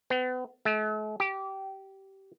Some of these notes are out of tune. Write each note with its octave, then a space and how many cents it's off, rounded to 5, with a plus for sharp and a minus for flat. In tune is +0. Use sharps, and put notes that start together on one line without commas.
B3 +40
A3 -45
G4 -20